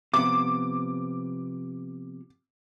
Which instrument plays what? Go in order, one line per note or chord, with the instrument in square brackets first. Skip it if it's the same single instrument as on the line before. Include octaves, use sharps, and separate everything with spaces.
[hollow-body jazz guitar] C3 F3 B3 [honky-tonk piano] D6